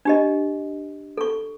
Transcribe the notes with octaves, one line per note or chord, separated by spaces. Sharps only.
D4 G4 D#5
A4 C#6